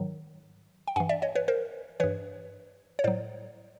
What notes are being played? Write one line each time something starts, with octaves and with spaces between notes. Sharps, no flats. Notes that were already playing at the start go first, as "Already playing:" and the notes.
Already playing: G#2 D#3 F#3
G5
G2 E3 F#5 G#5
D5 E5
C#5 D#5
B4 C#5
A#4 C5
G2 E3 B4 C#5
C#5
A2 F#3 C5 D5